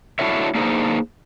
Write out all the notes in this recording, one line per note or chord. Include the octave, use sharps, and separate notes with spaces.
D4 E4 F#4 A4 C#5 E5
A#3 D4 D#4 G#4 C5